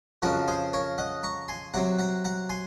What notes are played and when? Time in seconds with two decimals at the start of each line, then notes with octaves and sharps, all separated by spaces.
0.22 F2 C#3 F3 F#4 A#4
0.48 G#4 C5
0.73 A#4 C#5
0.98 D#5 F#5
1.23 A#5 C#6
1.48 G#5 C6
1.74 C3 F#3 C4 F#5 A#5
1.99 F#5 A#5
2.24 F#5 A#5
2.49 G#5 C6